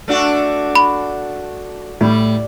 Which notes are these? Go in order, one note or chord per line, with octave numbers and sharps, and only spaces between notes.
A3 D4 F#4
B5
A2 G3